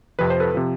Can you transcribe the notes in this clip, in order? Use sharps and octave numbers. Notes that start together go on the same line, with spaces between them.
F2 C3 F3 B4
C5
A4 B4
C3 F3